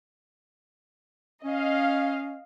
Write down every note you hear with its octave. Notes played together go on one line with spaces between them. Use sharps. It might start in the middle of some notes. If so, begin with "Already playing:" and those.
C#4 D#5 F5